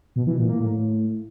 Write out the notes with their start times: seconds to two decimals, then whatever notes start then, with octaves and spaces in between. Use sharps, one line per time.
0.16 B2
0.27 E3
0.38 A#2
0.49 A#3
0.60 A2